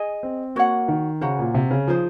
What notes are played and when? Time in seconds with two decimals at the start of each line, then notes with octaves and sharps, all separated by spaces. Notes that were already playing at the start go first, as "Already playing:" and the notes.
Already playing: G#4 D#5 G#5
0.23 C4
0.56 A#3 F#4 C#5 F#5
0.88 D#3
1.21 C#3 F#4 C5 F#5 A#5
1.39 A#2
1.54 C3
1.71 C#3
1.87 F3 D#4 G#4 C5